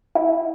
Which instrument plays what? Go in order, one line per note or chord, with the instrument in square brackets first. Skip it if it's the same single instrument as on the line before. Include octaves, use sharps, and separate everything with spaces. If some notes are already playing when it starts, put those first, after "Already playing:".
[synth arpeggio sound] E4